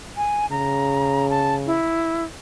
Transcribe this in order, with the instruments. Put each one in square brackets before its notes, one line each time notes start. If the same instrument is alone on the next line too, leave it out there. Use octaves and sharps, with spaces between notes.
[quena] G#5
[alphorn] C#3 [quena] A#5
[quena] A5
E4